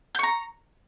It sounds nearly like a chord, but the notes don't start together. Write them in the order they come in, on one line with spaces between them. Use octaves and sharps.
G6 C#6 A#5